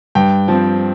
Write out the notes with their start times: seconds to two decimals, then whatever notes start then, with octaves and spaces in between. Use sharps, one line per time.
0.15 G2 G5
0.48 F3 C4